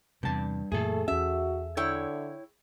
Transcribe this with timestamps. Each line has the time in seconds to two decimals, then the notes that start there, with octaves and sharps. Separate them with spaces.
0.23 E2 G2 C3 A5
0.72 F#2 A#2 E3 A3 G#4 A4
1.08 E2 C#4 F#4 E5
1.77 D3 E4 C#5 G5